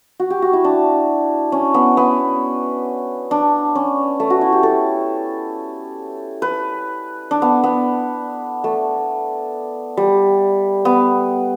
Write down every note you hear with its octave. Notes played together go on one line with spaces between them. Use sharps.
F#4
G4
F#4
E4
D4
C#4
B3
B3
D4
C#4
A3
F#4
E4
G4
A4
B4
D4
B3
B3
A3
G3
B3